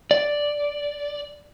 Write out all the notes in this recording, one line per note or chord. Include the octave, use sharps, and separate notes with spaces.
D5